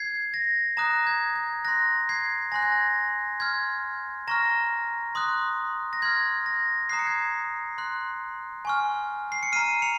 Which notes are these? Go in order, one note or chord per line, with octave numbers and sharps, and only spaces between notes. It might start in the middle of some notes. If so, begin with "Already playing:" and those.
Already playing: G#6 C7
A#6
A#5 D#6 F#6 A#6
G#6
G#6
C6 F#6 A#6
G#6 C7
G#5 C6 F#6 A#6
G#6
A#6
C6 F6 G#6
A#5 C#6 F6 A#6
C6 D#6 F#6
A#6
C6 F6 G#6
A#6
A#5 D#6 F#6 C7
C#7
G#6 C7
C6 F#6
G#5 C#6 F6
C7
C#7
A#5 F6 C7 D#7
C#7 F7